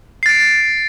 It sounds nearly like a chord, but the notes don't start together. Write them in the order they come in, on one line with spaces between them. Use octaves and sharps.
C7 A6 D7